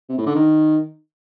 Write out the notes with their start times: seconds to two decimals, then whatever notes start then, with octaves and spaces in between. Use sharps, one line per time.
0.09 C3
0.18 A2
0.26 D3
0.35 D#3